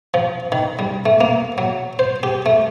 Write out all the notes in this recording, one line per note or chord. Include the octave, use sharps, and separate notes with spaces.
F3
D#3
G3
A3
A#3
F#3
C5
G4
A3